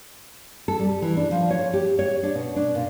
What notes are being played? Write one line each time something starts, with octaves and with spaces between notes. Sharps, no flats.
A4
G3
E3
D4
F3
C#5
G4
C#5
D4
B2
D4
A#2